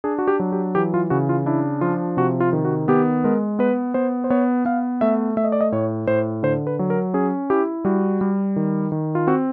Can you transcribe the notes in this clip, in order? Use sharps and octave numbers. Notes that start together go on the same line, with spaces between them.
D4 G#4
F#4
G4
F#3
G4
E3 G4
F4
C#3 F#4
F4
D4 E4
F3 F4
C3 F#4
F4
D#3
F#4
B3 G4
G#3 A#4
B3 B4
B3 C5
C5
B3 C#5
B3 F5
A3 E5
A3 E5
D#5
D5
D#5
A2 C#5
A2 C5
D3 C5
B4
F#3
A#4
C#4 G#4
E4 G4
G3 F#4
G3
D#3
D#3
F4
C4 F#4